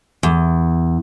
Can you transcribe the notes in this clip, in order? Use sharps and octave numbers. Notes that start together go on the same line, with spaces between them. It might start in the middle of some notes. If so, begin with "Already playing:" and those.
E2